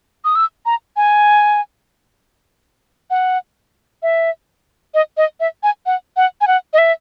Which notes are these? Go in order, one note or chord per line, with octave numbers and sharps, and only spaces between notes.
D#6
E6
A#5
G#5
F#5
E5
D#5
D#5
E5
G#5
F#5
F#5
G#5
F#5
D#5
E5